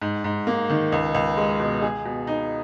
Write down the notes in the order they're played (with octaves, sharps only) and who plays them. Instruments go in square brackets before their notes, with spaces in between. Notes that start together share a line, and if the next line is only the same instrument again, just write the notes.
[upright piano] G#2
G#2
A#3
D#3
C#2
C#2
G#3
B2
G#4
B2
D#4